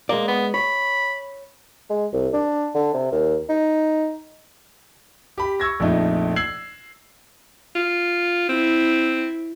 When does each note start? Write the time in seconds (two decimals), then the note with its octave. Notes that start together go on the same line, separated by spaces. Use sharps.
0.09 G#3 A#3 D5
0.28 B3
0.54 C#5 B5
1.90 G#3
2.13 C2
2.33 D4
2.75 D3
2.94 C3
3.12 D#2
3.49 D#4
5.38 G4 B5
5.60 C#6 E6 G#6 A#6
5.80 A#1 F2 A3 D#4
6.36 E6 G#6 C7 F#7
7.75 F4
8.49 C4 E4